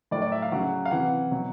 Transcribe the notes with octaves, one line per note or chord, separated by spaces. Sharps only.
A2 F#3 D5
D5
E5
F5
C#3 F#3 F#5
F5
C3 E3 F#5
B2 F#3